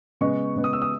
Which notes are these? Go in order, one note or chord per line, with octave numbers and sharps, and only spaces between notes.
C#3 G#3 B3 C#6
C#3 G#3 B3
D#6
E6
D#6